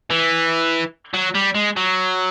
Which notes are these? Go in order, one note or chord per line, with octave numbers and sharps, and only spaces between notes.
E3
F#3
G3
G#3
F#3